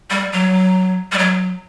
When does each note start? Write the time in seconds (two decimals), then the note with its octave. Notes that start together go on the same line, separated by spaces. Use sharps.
0.10 G3
0.32 F#3
1.12 G3
1.18 F#3